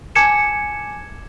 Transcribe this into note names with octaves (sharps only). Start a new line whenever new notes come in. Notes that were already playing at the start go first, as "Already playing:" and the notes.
G#5 A5 D6 G#6 C#7 E7